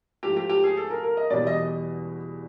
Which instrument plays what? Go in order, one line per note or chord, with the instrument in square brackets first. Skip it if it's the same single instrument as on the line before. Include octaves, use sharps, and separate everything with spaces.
[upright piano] G#2 F3 A3 [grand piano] G4
[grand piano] G4
G4
G#4
A4
A#4
A#4
D#5
[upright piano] E2 B2 G3 [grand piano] D5
[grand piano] D#5